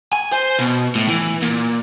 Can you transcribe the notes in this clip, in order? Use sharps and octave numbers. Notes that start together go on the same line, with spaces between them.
G#5
C5
B2
A2
E3
A#2